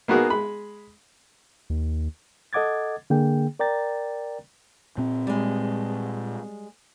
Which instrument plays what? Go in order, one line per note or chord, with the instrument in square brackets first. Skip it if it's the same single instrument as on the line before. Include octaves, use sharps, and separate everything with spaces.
[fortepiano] A#3 B3 D#4 F#4 G#4 A#4
G#3 B5
[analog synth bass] D#2
[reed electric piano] A4 D#5 F#5 D6 G#6 A6
D3 A#3 G#4 G5
A#4 D5 G5 A#5 A6
[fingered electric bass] A#2 C4
[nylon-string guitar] G3 G#3